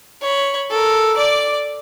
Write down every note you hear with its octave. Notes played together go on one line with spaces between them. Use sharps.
C#5 B5
A4 A#4
D5 D6